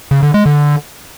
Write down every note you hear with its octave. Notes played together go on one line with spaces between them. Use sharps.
C#3
D3
G#3
D3